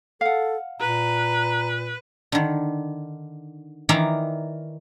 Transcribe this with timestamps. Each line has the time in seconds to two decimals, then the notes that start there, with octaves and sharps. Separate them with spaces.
0.21 A4 F5 F#5
0.80 A#2 B4 A#5
2.32 D3 D#3
3.89 D#3 E3 D5 E5 F5 A#5